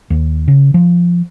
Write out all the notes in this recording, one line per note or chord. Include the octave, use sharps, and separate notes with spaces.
D#2
C#3
F3